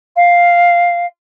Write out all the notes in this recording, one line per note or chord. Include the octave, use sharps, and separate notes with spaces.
F5